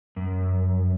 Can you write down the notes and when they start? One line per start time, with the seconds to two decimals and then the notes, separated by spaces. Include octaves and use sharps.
0.16 F#2